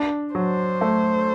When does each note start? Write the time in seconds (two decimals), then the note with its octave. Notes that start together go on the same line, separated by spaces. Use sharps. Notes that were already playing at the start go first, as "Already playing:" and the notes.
Already playing: D4
0.35 F#3 C5
0.81 A3